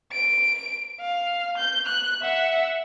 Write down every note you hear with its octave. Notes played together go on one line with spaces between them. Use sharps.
D7
F5
G6
F#6
E5 F#5